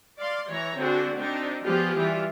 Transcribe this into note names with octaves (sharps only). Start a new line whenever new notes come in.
D5 F5 C6
E3 C#5 A#5
D3 C4 D4 F#4 G#4
C4 D4 D#4
F3 B3 F4 G4 G#4
E3 G3 F4